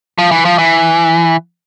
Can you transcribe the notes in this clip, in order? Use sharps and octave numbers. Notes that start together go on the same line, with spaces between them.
F3
E3
F3
E3